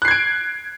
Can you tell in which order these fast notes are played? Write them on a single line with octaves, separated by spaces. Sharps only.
F#6 C7 G#6 D7